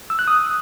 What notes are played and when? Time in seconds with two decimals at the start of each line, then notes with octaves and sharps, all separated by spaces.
0.10 E6
0.19 F#6
0.27 D#6